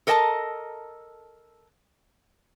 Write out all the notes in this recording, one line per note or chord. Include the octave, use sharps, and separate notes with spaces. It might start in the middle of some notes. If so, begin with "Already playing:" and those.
A4 A#4 D#5 G5 A5 A#5